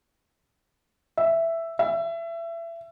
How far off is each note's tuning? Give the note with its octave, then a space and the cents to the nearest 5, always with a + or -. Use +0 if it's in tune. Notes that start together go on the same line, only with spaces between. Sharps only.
E5 +5
E5 +25